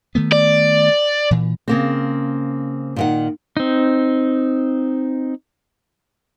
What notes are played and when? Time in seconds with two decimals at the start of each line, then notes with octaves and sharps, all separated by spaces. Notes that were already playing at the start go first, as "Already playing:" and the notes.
0.15 D#3 A3 B3
0.32 D5
1.31 A#2 E3
1.68 C#3 A#3 C4
2.96 A#2 D#3 F#5
3.57 C4 D#4